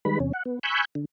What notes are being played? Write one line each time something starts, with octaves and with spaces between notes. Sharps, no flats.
D#3 G3 G#3 B4 B5
E2 C3 C#4
F#5
B3
G#5 B5 C#6 E6 F#6 G6
D3